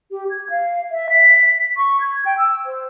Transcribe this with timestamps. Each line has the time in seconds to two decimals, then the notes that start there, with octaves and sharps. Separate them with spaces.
0.11 G4
0.30 G#6
0.50 F5
0.91 E5
1.10 B6
1.77 C#6
2.01 G#6
2.26 G5
2.38 E6
2.66 C5